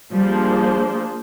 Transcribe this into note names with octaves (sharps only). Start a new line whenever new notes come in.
F3 G3 A#3 D4 G#4 C5